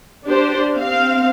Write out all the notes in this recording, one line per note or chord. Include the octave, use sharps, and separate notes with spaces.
D4 G4 C5
C4 F5